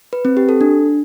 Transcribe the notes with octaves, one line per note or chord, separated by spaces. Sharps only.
B4
C4
G4
A4
D4